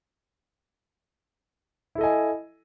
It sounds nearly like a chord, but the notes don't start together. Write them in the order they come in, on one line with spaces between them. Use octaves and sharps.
E4 A4 D#5 G#5